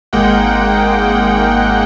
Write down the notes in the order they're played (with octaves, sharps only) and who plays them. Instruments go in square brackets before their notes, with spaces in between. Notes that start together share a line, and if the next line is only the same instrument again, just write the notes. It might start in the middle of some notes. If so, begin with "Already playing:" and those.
[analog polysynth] G#1 G#3 A#3 F#5 G5